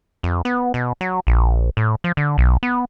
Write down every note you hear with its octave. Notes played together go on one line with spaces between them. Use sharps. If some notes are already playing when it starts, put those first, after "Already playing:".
F2
B3
B2
F#3
A#1
A2
F3
D3
B1
B3